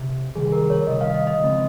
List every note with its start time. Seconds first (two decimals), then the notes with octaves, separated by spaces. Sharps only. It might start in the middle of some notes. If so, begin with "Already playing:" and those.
Already playing: C3
0.35 C3 D#3 G3 G#4
0.52 A#4
0.70 C#5
0.87 C3 D#3 G3 D#5
1.01 F5
1.14 D#5
1.27 D#5
1.39 C#3 F3 G#3 C4